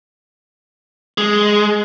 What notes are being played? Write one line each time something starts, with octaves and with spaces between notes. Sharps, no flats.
G#3